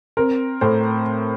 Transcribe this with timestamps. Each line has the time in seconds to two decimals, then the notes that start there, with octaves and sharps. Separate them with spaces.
0.17 C4 A#4
0.61 A2 A4 C5